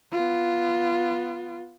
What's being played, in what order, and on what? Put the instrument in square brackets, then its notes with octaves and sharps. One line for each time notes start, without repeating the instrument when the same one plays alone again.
[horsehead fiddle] B3 F4